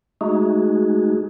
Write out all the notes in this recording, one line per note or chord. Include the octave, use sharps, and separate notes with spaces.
G#3 A3 D#4 F#4 G#4